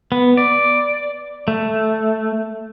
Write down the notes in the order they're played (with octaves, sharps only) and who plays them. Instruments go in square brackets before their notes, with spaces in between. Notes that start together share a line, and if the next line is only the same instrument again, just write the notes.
[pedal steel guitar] B3
D5
A3